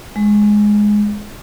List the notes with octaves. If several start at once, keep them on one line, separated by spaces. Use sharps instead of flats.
G#3